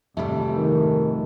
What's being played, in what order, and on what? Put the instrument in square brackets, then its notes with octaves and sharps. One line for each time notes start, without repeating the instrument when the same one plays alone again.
[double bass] G#1 G#2 [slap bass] F2 C3 G3 [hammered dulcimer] A3 E4
[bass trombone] D#3